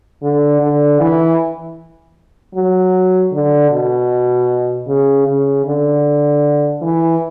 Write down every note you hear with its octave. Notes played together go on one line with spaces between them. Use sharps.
D3
D3
E3
F#3
D3
B2
C#3
C#3
D3
E3